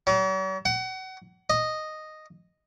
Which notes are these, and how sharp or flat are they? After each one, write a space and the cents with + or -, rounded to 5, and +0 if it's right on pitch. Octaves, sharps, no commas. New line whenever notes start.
F#3 +45
F#5 +30
D#5 -5